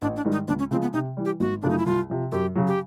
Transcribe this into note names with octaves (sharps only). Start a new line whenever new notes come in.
A1 D4
D4
G#2 D#3 G3
D#4
C#2 D4
C#4
C#3 F3 G#3 C4
B3
C3 D#4
E3 G3
G4
G#1 F#4
F#2 C#3 F3 A3 D4
D#4
E4
C2 F4
C3 F3
F#2 G4
C#3 F#3
G4